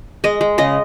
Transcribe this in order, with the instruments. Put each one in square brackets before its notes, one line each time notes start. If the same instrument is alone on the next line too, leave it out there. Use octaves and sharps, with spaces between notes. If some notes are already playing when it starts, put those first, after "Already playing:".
[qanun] G#3 D#5
G#3
C#3 D#5